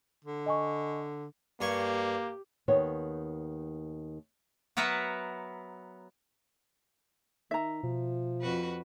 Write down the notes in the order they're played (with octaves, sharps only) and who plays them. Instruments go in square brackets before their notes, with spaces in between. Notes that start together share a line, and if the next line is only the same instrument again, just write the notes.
[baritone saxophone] D3
[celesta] D#5 G#5 C#6
[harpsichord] G2 G#5 C#6 [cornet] A#3 [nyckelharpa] G4
[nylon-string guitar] D#2 D#3 B3 C#5
[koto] F#3 B3 A#4 B4 E5 F#5
[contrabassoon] D#3 [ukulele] E5 A#5
[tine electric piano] B2 [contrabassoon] F3
[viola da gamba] F2 F#4 B4